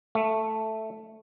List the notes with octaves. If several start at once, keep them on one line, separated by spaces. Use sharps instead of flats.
A3